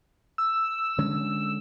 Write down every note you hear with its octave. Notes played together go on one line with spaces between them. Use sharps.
E6
D3 G#3 C#4